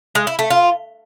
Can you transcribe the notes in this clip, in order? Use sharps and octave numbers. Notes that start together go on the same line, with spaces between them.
G#3
E4
A3
F4